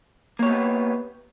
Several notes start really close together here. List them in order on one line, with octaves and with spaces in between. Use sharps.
A#3 C#5 G4 B3 B4